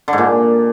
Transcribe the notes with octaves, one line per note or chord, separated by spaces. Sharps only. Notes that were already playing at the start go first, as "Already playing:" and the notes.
D3
G#2
A#2